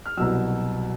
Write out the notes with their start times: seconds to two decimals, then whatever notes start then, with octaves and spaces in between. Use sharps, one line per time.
0.06 F6
0.17 C2 B2 F#3 E6